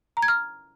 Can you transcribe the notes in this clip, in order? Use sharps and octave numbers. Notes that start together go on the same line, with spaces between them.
A#5
G#6
F6